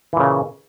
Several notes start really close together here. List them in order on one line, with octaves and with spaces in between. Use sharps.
E3 A#2 C#3